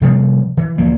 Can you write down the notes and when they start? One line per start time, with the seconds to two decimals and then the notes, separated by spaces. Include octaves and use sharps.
0.01 C3 F3 G3 C4
0.57 E3
0.78 D2 F3 A#3